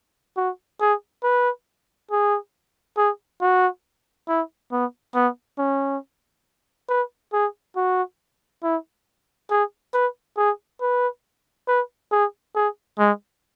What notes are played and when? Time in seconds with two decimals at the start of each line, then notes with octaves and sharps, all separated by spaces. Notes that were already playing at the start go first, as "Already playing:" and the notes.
0.37 F#4
0.80 G#4
1.23 B4
2.11 G#4
2.97 G#4
3.41 F#4
4.28 E4
4.72 B3
5.15 B3
5.58 C#4
6.89 B4
7.33 G#4
7.76 F#4
8.63 E4
9.50 G#4
9.93 B4
10.37 G#4
10.81 B4
11.67 B4
12.12 G#4
12.55 G#4
12.99 G#3